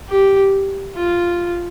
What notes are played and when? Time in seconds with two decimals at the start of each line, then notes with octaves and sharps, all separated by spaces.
0.08 G4
0.95 F4